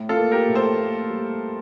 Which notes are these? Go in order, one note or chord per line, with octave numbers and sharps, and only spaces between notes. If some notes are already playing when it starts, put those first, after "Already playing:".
Already playing: A2
F4 A4
A#3
G4 A#4
A2
A4 C5
A#3
G3